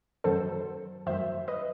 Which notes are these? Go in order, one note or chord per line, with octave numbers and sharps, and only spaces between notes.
F#2 D#3 F#3 A4 C5
F#2 D#3 F#3 C5 E5
B4 D#5